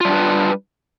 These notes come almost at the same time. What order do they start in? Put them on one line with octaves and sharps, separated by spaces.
F4 G3 D4 B4